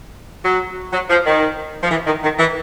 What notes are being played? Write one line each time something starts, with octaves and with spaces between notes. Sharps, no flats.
F#3
F#3
F3
D#3
F3
E3
D#3
D#3
E3